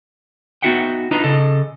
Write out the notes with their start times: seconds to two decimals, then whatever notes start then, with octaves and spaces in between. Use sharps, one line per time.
0.62 B3 D#4 F#4 E5 F#5 G5
1.11 D4 D#4 F4 B4 D#5 A#5
1.24 C#3 A4 D#5